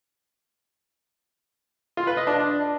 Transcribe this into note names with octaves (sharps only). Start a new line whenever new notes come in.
F4
B4
D#5
D4